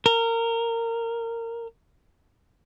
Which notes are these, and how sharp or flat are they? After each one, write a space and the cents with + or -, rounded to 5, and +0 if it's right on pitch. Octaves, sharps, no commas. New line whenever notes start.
A#4 -20